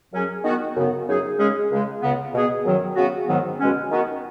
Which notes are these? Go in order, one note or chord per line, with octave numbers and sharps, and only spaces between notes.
F#2 F#3 C#4 G#4
D#3 B3 F#4
F#2 C#3 B3
F#2 C#3 F#3 D#4 G#4
C#3 G#3 C#4 G#4
C#2 C#3 G#3
C#2 C#3 B3
B2 B3 G#4
F#2 D#3 F#3
C#3 B3 F#4
G#2 D#3 F#3 B3
C#2 B2 G#3 C#4
D#3 B3 F#4